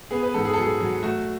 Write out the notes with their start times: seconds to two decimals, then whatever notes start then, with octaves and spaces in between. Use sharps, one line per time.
0.11 B3 G#4
0.23 B4
0.34 G#2 A4
0.45 G#4
0.54 A4
0.58 F#3 G#4
0.80 F#3
1.03 A3 F#4